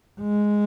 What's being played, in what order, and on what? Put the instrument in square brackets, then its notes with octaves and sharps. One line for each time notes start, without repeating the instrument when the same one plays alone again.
[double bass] G#3